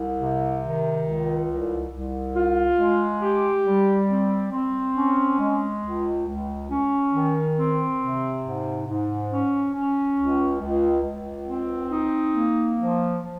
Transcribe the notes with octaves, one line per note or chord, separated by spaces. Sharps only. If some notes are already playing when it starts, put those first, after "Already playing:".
Already playing: C2
C3
D#3
C#2
C2
C2
F4
G#3
G4
G3
C4
C4
C#4
G#3
C#2
C#2
C#4
D#3
C4
C3
G#2
G#2
C#4
C#4
C#2
C#2
C#2
C4
D#4
A#3
F3
F3